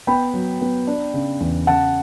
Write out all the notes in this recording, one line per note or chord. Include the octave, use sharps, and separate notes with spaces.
B3 G5 B5
F#3
B3
D4
C#3
E2
C#3 F#5 A5